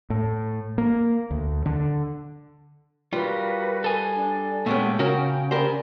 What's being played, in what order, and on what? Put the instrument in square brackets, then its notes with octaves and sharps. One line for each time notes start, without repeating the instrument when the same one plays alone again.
[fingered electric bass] A2
A#3
D2
D3
[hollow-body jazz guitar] G3 F4 [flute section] F#4 A#4 B4
[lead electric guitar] A4 G#5
[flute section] D4
[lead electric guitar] A#2 G#3 [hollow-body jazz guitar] A3 B3 C#4 [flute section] G5
[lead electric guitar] C#3 [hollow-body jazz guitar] C#4 F#4 A#4
[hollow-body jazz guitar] G4 A#4 C5 [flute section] D5 G#5 B5